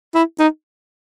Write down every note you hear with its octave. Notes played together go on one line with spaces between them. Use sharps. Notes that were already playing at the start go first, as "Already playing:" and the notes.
E4
D#4